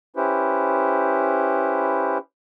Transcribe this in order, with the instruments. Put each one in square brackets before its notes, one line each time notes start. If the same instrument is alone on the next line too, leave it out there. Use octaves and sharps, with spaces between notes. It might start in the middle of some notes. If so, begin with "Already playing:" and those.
[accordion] C#4 E4 G4 B4 C5